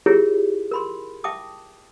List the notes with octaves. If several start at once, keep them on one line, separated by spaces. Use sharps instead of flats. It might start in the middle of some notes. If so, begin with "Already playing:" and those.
E4 F4 G4 G#4 A#4 C#5
A#4 B5 C6
E5 G5 A5 D6 D#6